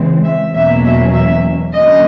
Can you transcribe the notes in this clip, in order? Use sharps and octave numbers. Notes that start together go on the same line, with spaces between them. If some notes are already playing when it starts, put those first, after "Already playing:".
Already playing: E2 C#3 E3 G#3 C4
E5
E2 B2 F#3 A#3 C#4 E5
E5
E5
D3 F#3 A#3 C#4 D#5